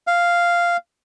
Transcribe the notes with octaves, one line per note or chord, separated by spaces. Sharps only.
F5